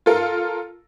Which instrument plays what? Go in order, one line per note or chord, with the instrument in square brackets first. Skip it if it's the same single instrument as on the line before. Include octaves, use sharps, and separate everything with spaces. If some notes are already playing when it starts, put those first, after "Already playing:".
[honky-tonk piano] F4 A4 A#4